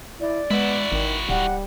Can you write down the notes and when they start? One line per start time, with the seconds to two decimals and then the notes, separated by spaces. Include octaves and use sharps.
0.20 E4 D5
0.51 G#3 B3 E4 F#4
0.92 G#1 D#3
1.29 D1 G3 F#5